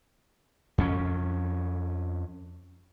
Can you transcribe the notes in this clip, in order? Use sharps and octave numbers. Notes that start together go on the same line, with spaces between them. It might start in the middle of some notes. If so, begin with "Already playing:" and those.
F2 C#4